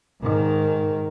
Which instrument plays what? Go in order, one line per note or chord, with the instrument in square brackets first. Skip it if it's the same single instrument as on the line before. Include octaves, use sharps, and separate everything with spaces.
[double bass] G#2 D#3